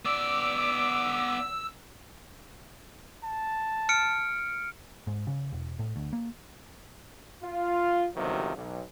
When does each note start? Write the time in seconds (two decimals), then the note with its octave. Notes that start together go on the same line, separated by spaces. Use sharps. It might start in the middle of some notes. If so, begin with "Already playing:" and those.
0.05 B3 D5 D6 E6
3.24 A5
3.89 F6 C#7 D7
5.07 G#2
5.27 C#3
5.53 E1
5.79 A2
5.96 D2
6.13 A#3
7.44 F4
8.15 G1 C3 D#3 F3 F#3
8.56 B1